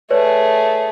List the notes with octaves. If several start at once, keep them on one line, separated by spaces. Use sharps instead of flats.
A3 G#4 B4 C#5 D5